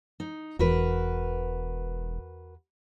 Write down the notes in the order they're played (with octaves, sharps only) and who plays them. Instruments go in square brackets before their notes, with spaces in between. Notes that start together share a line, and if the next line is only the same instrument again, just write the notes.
[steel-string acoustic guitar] D#4
[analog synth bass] E1 [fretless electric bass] E2 [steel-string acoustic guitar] F#4 A#4 B4